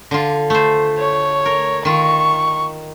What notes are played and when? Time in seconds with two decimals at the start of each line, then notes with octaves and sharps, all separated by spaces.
0.11 D3 F4
0.50 A3 C5
0.98 C#5
1.46 A#4
1.85 D#3 F4 C#6